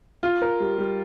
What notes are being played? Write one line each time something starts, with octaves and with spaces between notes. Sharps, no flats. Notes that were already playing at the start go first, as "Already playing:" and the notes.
F4
A#4
G3
G3